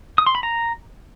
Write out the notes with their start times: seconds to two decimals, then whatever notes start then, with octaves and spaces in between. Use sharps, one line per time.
0.18 D#6
0.27 C6
0.35 B5
0.43 A#5